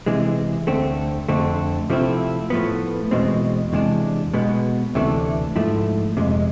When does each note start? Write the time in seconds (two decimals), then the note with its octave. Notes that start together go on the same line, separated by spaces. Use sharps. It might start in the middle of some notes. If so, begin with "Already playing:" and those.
0.06 C3 E3 G#3
0.67 D2 D3 A3 C4
1.29 F2 D3 A3 C4
1.90 C3 F3 A3 C4 E4
2.50 A2 F3 B3
3.11 E2 B2 G#3 C4
3.73 E2 C3 G#3 D4
4.34 B2 G#3 B3
4.95 D2 C3 E3 A3 D4
5.56 G#2 F3 A3 E4
6.17 F2 C3 G#3